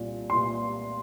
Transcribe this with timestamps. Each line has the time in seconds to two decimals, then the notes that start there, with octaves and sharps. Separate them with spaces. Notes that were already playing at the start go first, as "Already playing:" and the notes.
Already playing: C2 A#2
0.30 A#2 C6